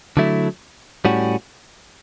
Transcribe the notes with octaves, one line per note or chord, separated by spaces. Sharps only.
D3 F#3 A3 E4
A2 G3 C#4 F#4